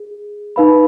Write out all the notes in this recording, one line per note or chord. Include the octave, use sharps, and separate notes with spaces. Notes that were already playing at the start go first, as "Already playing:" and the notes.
Already playing: G#4
D#4 B4 F5 B5